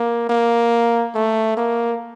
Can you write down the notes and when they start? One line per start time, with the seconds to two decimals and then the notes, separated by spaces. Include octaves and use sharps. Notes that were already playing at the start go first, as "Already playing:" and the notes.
Already playing: A#3
0.29 A#3
1.15 A3
1.57 A#3